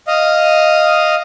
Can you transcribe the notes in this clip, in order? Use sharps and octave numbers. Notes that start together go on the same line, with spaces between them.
D#5 F5